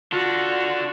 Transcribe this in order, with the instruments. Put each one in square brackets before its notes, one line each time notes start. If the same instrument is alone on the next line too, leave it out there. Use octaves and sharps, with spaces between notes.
[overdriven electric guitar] D4 A4 [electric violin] F4 F#4